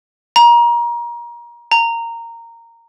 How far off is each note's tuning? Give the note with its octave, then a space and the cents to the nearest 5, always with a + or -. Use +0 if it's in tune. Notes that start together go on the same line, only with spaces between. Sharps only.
A#5 +30
A#5 -15